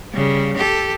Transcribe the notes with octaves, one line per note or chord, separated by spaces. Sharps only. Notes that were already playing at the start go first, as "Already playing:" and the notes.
C#3 G3
G4 A4